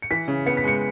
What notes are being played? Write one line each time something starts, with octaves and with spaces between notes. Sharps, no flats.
C#7
E3 B6
C#3
B3 C#7
B6
G#3 C#7